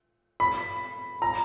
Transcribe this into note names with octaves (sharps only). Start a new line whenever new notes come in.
B5
A#5